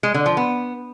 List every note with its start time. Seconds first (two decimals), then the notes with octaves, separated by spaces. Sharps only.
0.03 G#3
0.14 D3
0.26 F3
0.37 B3